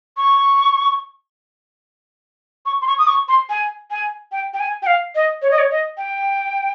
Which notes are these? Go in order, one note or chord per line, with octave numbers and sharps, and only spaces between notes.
C#6
C#6
C6
C#6
D#6
C#6
C6
G#5
G#5
G5
G5
G#5
G5
F5
D#5
C#5
D#5
C#5
D#5
G5